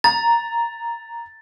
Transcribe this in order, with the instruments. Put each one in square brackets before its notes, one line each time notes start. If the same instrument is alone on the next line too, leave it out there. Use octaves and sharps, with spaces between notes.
[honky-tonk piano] A#5 [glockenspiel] A6